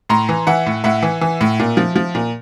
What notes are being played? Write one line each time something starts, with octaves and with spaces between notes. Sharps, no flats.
A2 A#5 C6
E3
E3 E5 F#5
A2
A2 E5 F#5
E3
E3
A2
A#2
F3
F3
A#2